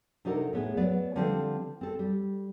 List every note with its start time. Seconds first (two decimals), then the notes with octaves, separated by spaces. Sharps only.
0.25 C3 D4 D#4 F#4 A4 A#4
0.53 A2 B3 G#4
0.77 F#3 B3 B4 D5
1.16 D3 F3 G3 C4 A4
1.81 C4 A4
1.99 G3